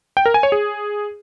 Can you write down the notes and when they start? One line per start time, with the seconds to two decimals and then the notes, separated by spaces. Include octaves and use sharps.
0.17 G5
0.26 A#4
0.34 G#5
0.43 C#5
0.52 G#4